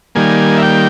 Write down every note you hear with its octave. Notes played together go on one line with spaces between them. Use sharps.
D#3 G3 A#3 G#5
E5
G5